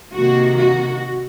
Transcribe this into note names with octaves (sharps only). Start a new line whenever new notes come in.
C3 D#3 A#3 F#4
F#4